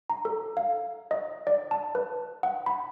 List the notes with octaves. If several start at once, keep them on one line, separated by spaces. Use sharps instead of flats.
A#5
A4
F5
D#5
D5
A5
B4
F#5
B5